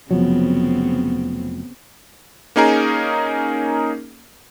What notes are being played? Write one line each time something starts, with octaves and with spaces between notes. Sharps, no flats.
F1 C#3 F3 F#3 B3 C4
A#3 C#4 D#4 G#4 A#4